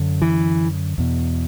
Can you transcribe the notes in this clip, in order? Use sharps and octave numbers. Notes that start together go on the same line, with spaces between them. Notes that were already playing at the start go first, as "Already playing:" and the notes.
Already playing: F#2 D3
E3
E2 B2